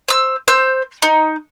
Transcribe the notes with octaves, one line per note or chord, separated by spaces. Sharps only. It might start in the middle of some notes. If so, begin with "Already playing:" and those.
C5 E6
C5 E6 G6
D#4